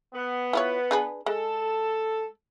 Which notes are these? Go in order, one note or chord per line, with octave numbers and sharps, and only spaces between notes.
B3
E4 F4 C#5
D4 G#4 B4
G#3 A4